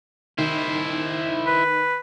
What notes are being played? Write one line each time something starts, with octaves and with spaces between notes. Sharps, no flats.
D#3 E4 C5
B4